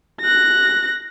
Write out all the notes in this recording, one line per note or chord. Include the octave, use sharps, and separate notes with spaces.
F#6 A#6